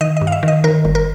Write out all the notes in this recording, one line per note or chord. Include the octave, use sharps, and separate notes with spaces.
D#3 D#5
D#5
G2
F5
E5
D#3
D#5
D#3 A#4
G1
A#4